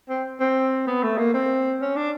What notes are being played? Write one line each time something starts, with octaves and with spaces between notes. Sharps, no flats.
C4
C4
B3
A3
A#3
C4
C#4
D4